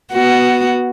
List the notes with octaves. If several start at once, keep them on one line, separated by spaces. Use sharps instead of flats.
B3 F#4